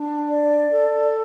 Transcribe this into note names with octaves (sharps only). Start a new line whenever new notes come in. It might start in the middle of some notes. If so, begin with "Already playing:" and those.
Already playing: D4
D5
A4